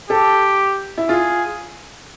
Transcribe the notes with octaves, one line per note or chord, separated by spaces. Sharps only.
G4 A4
E4
F4 G#4